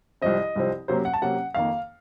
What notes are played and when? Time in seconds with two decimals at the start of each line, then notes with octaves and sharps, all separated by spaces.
0.21 C2 C3 F3 C4 D#5
0.56 C2 C3 F3 C4
0.88 C3 F#3 A#3 C#4 C5
1.05 F#5
1.14 A5
1.22 C3 F#3 A#3 C#4 F#5
1.54 F2 D#3 A#3 F5